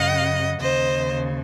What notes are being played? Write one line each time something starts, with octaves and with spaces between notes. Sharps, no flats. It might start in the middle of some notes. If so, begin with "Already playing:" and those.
Already playing: F#2 C#3 D#5 F#5
D#2 C#3 C5 D#5